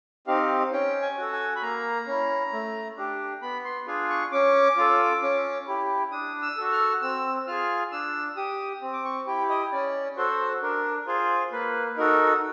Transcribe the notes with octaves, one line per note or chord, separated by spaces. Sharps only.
C4 D#4 G4 F5
C#4 G5
G#5
F#4 A4
G#5
B5
A#3 A#5
C#4 E4
A3
D4 G4
B3 B5
C6
D4 F4 G#4
C#6
C#4 D6
F4 A4
C#4
E4 G4
D4 D#6
E6
F#4 A4
F6
C4 E6
F4 G#4 F6
D4 E6
G4 D#6
C4
D6
C#6
E4 G4 G5
D#5
C#4 D5
F#4 A4 C5
D4 A#4
F4 G#4 C5
A#3 B4
D#4 F#4 A4 A#4